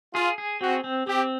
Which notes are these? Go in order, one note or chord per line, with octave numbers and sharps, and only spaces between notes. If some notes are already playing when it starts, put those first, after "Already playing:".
F4 G#4
G#4
C4 F#4
C4
C4 G4